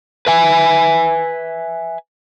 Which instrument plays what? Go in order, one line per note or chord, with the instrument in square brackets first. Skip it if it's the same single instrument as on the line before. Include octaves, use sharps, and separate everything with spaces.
[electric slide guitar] B4 E5 G#5